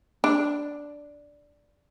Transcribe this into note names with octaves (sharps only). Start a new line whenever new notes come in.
D4